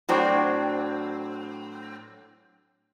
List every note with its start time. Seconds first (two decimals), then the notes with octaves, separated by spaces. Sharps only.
0.09 A2 F#3 C4 D4